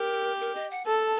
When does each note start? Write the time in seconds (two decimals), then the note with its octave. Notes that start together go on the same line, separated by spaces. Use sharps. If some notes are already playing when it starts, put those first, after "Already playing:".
Already playing: G4 A#4
0.40 A#4
0.55 D#5
0.71 F#5
0.87 A4 A5